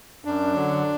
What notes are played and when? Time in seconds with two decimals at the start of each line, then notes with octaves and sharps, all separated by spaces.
0.25 F#2 D4
0.54 D3 F#3